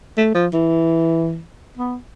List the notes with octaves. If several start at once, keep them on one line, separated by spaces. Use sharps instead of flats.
A3
F3
E3
B3